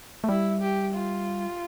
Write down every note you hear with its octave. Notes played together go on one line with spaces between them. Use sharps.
A3
G3 E4
G4
F4